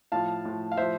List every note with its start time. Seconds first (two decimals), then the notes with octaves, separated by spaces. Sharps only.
0.12 A2 F3 F5 A5
0.45 A2 F3
0.72 F5
0.77 A2 F3 C5 E5